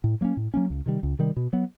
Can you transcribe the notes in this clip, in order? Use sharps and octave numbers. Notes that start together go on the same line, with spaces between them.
A2
F#3 A#3 C#4
A2
F#3 A#3 C#4
C#2
C3 D#3 G3
C#2
C3 D#3 G3
B2
F#3 B3